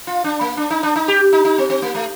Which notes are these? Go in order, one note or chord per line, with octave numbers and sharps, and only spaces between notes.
F4
D4
A#3
D4
D#4
D4
D#4
G4
D#4
D#4
C4
C4
A#3
A3